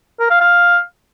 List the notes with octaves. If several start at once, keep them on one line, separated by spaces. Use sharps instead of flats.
A#4
F5
F5